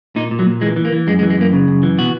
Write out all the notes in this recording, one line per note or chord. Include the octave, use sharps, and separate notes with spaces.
A#2 D#4
A#2
F#3
A#2
E3 G#3
E3
A#3
E3
F#2 G#3
G#3
E3
G#3
F#2 A#3
C#3
F#2
E3
B2 F#4